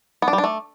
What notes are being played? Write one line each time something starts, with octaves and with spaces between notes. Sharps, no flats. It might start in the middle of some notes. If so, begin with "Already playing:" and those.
B3
D4
G3
D4
A3